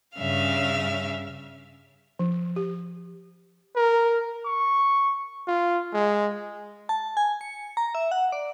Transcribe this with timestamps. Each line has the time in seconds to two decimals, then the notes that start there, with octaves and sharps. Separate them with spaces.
0.17 G2 C#3 C#4 E5 F5 F6
2.19 F3
2.56 G4
3.76 A#4
4.45 C#6
5.47 F4
5.93 G#3
6.89 A5
7.17 G#5
7.41 C#7
7.77 A#5
7.95 E5
8.12 F#5
8.32 D5